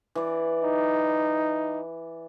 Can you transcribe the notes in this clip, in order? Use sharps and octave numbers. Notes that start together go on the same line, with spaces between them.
E3 D5
D#4